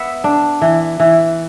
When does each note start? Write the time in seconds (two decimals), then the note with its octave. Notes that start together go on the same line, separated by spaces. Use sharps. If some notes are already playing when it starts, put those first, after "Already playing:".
Already playing: B3 E5 F#5
0.24 D4
0.61 E3
1.00 E3